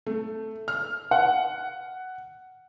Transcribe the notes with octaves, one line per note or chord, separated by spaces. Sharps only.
A3
F6
F#5